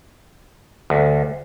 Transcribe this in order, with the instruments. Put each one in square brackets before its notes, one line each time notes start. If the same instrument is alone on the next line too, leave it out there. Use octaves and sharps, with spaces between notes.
[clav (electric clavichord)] D2